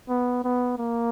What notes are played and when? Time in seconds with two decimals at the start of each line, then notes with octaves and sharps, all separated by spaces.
0.09 B3
0.44 B3
0.78 A#3